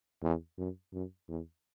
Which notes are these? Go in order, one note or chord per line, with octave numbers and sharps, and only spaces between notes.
E2
F#2
F#2
E2